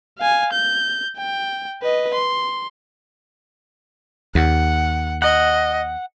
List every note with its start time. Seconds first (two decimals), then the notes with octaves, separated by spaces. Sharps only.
0.19 F5 G#5
0.53 G6
1.18 G5
1.82 B4 D#5
2.14 C6
4.35 D#2 F#5
5.22 D#5 F#5